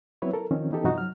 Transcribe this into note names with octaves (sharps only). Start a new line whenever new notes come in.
F#3 B3 C4 E4 B4 C#5
A4 A#4
D#3 F3 C4 C#4
E3 B3 D#4 G4 A4
G2 C3 F3 D#4 F#4
F#3 F6